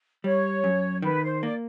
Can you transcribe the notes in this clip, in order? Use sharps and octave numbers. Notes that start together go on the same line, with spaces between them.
G3 C#5
F#2
D#3 B4
C5
A#3 D5